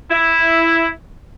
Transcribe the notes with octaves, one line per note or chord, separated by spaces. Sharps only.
E4